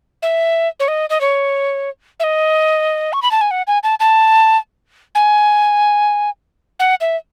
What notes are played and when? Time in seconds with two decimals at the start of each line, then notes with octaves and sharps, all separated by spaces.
0.22 E5
0.80 C#5
0.88 D#5
1.10 D#5
1.21 C#5
2.20 E5
2.24 D#5
3.13 C#6
3.22 B5
3.31 A5
3.41 G#5
3.51 F#5
3.67 G#5
3.83 A5
4.00 A5
5.15 G#5
6.79 F#5
7.01 E5